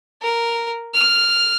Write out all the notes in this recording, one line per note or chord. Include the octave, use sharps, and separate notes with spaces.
A#4
F6